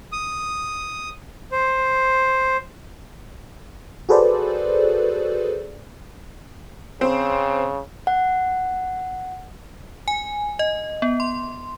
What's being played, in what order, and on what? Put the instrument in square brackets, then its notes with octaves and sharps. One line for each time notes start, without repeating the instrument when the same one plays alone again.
[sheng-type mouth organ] D#6
C5
[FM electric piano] F#4 G#4 A4 B4 C5 D5
[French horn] C#3 [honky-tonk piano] C4
[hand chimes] F#5
[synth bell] G#5
D#5
B3
C6